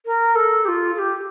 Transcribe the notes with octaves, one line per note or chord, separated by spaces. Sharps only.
A#4
A4
G4
F4
A4
G4